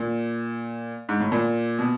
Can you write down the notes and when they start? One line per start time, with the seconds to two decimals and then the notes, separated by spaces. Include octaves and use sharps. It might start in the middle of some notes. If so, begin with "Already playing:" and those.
Already playing: A#2
1.09 G#2
1.20 A2
1.32 A#2
1.79 B2